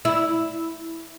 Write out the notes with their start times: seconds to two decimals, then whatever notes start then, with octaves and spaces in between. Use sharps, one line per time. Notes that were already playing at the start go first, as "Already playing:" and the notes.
0.05 E4